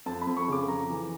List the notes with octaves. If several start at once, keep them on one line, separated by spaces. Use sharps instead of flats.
F2 A5
B5
F2
C#6
C#3 D6
F2 A#5
E3